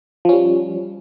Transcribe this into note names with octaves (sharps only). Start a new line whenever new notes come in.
F3 G3 C#4